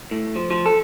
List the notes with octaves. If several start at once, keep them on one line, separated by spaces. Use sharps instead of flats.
A2
F3
F3
A4